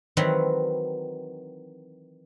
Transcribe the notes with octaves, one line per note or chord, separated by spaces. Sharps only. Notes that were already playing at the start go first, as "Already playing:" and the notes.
D#3 E3 F#3 C4 F#4 B4